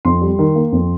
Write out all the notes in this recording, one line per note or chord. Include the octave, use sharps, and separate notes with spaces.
F2 C6
G3
D#3
A#3
F2